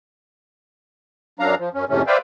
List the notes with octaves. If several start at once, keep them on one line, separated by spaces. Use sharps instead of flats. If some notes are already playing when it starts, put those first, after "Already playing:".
F#2 F#3 D4 F5 A#5
F3
F#2 C#4
F2 G#2 C3 E3 A3 C#4
B4 C5 D5 E5 F5 G5